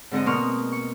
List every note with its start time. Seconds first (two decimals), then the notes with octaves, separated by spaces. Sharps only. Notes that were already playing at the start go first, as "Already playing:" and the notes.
0.11 G#2 D3 C4 A4 D#5
0.26 B2 A#3 C6 C#6 F6
0.72 C#6